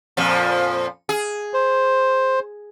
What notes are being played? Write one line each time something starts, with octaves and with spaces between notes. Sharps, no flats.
F2 A#2 F3
G#4
C5